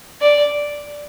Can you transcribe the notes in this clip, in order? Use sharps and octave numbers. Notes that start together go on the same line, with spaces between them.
D5